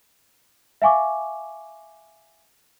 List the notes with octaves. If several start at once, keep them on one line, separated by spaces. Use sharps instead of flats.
E5 F5 G#5 C#6 D6